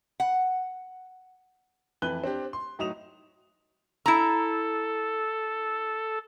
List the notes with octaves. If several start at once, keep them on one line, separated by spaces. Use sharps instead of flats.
F#5
F2 E3 B4 F#6 G7
C4 D4 G4
C6
A2 F#3 D#4 D#6 E7 F7
E4 A4 A#5